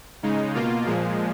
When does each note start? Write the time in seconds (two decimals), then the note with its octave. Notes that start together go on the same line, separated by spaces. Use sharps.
0.23 C#3 G#3 D#4
0.54 B2 A#3 F4
0.86 A#2 F3 G#3